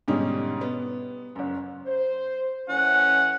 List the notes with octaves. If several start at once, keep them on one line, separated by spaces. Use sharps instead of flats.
G#2 B2 D3 G3 C#4 D#4
B3
F#1 F#2
C5
E3 A3 C#4 F#5